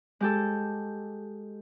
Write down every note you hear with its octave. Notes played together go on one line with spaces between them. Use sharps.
G#3 G4 A4